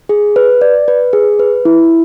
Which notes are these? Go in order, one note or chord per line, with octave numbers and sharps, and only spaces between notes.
G#4
B4
D5
B4
G#4
B4
E4